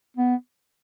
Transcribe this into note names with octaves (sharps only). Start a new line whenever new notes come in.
B3